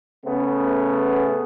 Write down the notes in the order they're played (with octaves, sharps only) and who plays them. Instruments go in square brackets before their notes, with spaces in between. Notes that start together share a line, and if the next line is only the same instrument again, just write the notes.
[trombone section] C#3 A3 B3